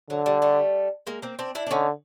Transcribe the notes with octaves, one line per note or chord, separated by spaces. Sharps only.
D3 F#3
G3
G3 A3
G#3 A#3
A#3 C4
C4 D4
D4 E4
D4
D3 C#4 D#4